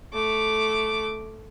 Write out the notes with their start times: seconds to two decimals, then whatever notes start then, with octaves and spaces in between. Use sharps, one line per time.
0.13 A3 D6